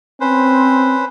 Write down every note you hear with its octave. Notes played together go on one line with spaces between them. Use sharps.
C4 C#4 B4 C5